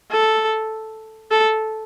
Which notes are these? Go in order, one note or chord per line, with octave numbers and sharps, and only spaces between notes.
A4
A4